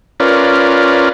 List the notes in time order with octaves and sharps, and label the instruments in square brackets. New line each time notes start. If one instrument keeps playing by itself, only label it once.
[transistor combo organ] C#4 F4 A#4 B4 D5